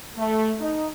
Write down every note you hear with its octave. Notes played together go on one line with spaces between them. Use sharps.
A3
D#4